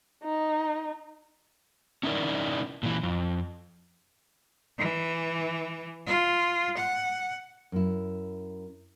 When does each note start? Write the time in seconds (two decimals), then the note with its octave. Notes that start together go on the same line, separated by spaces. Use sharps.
0.24 D#4
2.03 C#4 D#4 E4 F#4 A#4 D5
2.83 A#2 E3
3.03 F2
4.78 E3
6.07 F4
6.77 F#5
7.72 F#2 E4